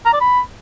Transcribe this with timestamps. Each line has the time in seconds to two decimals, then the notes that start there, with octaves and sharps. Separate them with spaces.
0.06 A#5
0.13 D5
0.21 B5